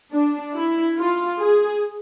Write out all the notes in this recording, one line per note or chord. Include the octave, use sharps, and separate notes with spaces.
D4
E4
F4
G#4